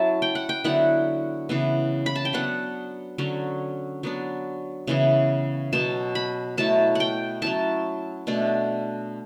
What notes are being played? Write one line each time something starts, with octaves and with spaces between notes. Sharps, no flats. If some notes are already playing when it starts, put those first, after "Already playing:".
Already playing: F#3 C#4 E4 A5
G5
F#5
G5
D3 F#3 B3 E4 F#5
C#3 E3 B3
B5
A5
G5
F#3 B3 D4 F#5
D3 F#3 C#4
F#3 B3 D4
C#3 E3 B3 E4
B2 F#3 B3 A5
B5
B2 F#3 A3 E4 A5
F#5 G5
F#3 C#4 E4 A5
B2 A3 D4